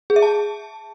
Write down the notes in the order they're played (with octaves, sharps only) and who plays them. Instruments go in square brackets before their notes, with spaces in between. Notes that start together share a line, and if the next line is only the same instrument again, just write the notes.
[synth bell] G#4
E5
A5